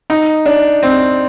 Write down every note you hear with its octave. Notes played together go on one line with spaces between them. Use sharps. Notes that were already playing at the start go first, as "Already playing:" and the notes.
D#4
D4
C4